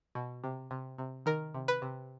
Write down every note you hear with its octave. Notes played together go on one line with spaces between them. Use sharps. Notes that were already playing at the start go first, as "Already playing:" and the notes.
B2
C3
C3
C3
D#3 A#4
C3
B4
C3